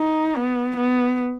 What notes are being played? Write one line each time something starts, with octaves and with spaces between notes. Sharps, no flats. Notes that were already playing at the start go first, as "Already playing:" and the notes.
Already playing: D#4
B3
B3